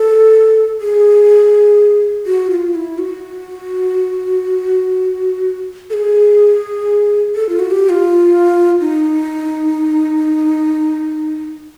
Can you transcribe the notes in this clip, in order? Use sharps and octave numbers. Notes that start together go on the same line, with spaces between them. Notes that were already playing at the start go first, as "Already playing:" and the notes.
Already playing: A4
G#4
F#4
F4
E4
F#4
A4
G#4
A4
F4
F#4
G4
F4
D#4